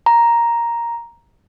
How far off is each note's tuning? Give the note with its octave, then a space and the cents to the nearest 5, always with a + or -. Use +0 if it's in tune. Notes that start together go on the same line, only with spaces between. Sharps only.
A#5 +5